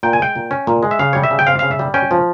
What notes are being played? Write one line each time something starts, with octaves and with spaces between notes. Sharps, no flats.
A#2 G5
G#5
G#3 G5
A#2
C#4
A#2
G#3
E5
C#3 F5
G3 C#5
E5
C#3
G5
C4 F5
C#3 F5
E5
G3
C#4 G5
F3